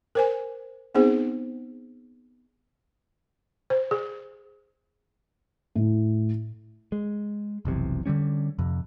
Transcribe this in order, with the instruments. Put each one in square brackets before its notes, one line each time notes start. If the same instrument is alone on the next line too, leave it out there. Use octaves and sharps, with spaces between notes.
[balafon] A#4 C5 G#5
B3 C4 D#4 G#4 C5
C5
G#4
[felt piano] A2
[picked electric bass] G#3
F1 B1 C3 E3
D3 F3 G3 C#4
F2 C3